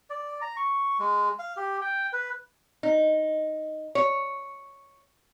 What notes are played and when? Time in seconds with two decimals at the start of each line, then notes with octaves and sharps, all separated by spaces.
0.10 D5
0.41 A#5
0.57 C#6
0.99 G#3
1.39 F5
1.57 G4
1.82 G5
2.13 B4
2.83 D#4
3.95 C#5